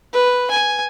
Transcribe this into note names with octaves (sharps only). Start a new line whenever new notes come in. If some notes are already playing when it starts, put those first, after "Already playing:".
B4
G#5